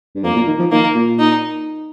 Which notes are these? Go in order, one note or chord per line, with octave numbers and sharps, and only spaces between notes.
G2
F2 A#3
A#2
D#3
F3
D#3 A#3
A#2
D#4